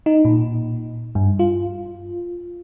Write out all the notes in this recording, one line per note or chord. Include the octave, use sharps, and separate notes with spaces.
D#4
A#2
G2
F4